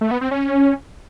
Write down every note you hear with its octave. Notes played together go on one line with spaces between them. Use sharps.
A3
B3
C4
C#4